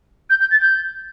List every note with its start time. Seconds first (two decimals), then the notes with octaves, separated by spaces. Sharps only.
0.29 G6
0.40 G6
0.51 A6
0.61 G6